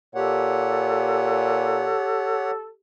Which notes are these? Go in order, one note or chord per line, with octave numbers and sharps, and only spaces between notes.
A#2 G4 A4 C#5 F#5